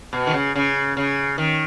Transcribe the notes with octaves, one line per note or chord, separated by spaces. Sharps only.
B2
D#3
C#3
C#3
C#3
D#3